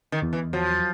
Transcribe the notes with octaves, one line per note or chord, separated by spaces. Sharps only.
D#3
E2
E3
F3 F#3